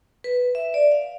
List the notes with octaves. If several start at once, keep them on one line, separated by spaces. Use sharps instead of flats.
B4
E5
D5
F5